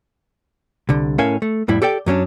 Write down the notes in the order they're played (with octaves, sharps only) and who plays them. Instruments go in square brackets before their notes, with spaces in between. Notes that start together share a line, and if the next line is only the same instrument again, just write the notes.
[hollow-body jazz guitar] C2 D3
A2 C#4 A#4 E5 F5 G#5
A3
F2 A2 G3 E4
G4 A4 D5 G5
F#2 F#3 C#4 D4